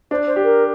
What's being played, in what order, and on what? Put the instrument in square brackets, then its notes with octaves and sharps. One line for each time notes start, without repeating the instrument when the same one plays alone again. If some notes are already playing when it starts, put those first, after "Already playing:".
[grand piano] D4 [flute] C5
[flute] C5
[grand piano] G4
[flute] A#4